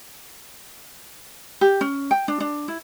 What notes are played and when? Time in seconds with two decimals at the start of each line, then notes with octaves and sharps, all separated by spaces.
1.61 G4
1.81 C#4
2.11 G5
2.28 D4
2.40 D4
2.68 E4